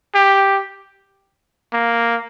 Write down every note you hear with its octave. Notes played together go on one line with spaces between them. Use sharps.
G4
A#3